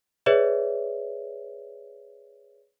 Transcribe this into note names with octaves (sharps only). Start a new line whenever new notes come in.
G#4 B4 C#5 D5 E5